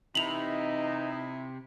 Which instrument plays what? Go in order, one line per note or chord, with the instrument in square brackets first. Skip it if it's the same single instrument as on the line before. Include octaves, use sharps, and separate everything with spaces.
[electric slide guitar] C3 [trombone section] E3 D#4 [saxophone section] E4 [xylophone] F7 F#7